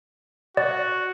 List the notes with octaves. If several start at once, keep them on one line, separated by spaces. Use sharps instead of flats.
F#4 D5